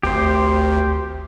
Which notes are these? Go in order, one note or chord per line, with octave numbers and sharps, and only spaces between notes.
G#1 D2 G4 C5